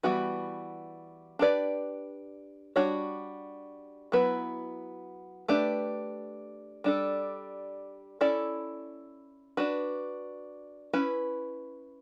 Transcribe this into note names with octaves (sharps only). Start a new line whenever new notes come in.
E3 G3 B3 F#4 B4
D4 G4 B4 D5
G3 D4 F#4 C#5
F#3 B3 E4 B4
A3 D4 G4 B4
G3 D4 A4
C#4 E4 A4 D5
D4 F#4 B4
C#4 E4 B4